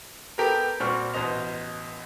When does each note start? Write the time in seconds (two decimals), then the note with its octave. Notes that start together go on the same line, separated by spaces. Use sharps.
0.38 B3 G4 A4 A#4
0.80 A#2 G3 C4 F#4 C#6 F6
1.14 A1 B2 C5 D#5 F7